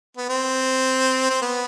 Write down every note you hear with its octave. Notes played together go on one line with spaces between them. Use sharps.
B3
C4
C4
B3